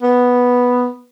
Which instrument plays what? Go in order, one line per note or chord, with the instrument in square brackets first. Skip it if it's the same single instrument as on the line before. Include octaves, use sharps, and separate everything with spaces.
[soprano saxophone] B3